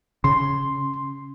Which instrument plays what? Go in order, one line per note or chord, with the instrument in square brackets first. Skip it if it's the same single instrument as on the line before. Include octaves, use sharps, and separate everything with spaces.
[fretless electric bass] C#3 [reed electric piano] C6